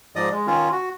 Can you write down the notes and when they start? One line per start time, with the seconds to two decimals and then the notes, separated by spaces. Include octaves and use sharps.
0.16 G#2 F3 D5 D#5 D#6
0.32 G#3
0.47 D#3 C#4 F4
0.72 F#4